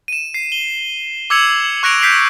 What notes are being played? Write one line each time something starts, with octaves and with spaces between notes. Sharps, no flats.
D#7 E7
C7
G7
D6 E6 G#6 C#7 F7 F#7
C#6 F#6 A#6 D7 F7
F#6 G6 B6 C7 D7 F7